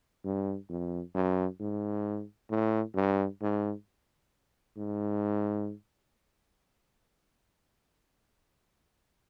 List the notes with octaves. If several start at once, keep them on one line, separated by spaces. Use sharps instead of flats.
G2
F2
F#2
G#2
A2
G2
G#2
G#2